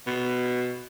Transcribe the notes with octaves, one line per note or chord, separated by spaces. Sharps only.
B2